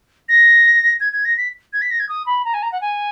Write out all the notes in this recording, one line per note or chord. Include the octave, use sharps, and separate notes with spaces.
A#6
G#6
G#6
A#6
B6
G#6
B6
A#6
G#6
D#6
B5
A#5
G#5
A#5
F#5
G#5